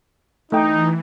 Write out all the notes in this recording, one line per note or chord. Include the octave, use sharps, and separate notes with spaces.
E3 A3 D#4 G5